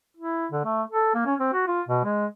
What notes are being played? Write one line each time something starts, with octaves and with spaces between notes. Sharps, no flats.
E4
D3
A3
A4
A#3
C#4
C4
F#4
F4
B2
G#3